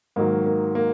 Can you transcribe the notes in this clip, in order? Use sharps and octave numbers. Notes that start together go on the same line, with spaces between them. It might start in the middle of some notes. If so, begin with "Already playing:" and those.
G#2 D#3 F#3 A#3
A#3
A#3